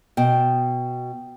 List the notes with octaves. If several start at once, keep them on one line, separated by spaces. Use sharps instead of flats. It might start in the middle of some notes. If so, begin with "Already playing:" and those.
B2 G5